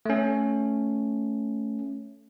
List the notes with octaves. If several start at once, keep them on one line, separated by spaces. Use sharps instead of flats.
A3 C#4